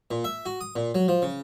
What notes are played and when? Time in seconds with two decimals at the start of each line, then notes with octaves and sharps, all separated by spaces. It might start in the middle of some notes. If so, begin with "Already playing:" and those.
0.11 A#2
0.24 E5
0.46 F#4
0.61 D#6
0.76 A#2
0.95 F#3
1.08 F3
1.22 C#3